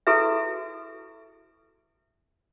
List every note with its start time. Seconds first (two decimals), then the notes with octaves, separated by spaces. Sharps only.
0.07 E4 F#4 G#4 A4 B4 E5